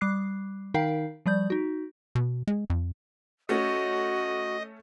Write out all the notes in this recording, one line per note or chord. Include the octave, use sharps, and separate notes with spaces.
G3 D6 F#6 C7
D#3 D#4 A#4 F5 G5 C7
F3 G3 D5 G6
D#4 F#4
B2
G#3
F2
A3 C#4 F#4 D#5